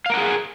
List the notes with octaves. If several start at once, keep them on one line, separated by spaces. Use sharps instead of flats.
G#4 A#4 F5 F#5